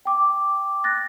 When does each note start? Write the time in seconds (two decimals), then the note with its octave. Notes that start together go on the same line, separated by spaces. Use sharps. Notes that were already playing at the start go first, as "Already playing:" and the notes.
0.05 G5 D6
0.84 F#6 A6 A#6